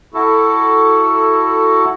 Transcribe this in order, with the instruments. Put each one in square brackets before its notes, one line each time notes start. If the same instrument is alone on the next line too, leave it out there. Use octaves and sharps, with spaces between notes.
[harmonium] E4 F#4 A4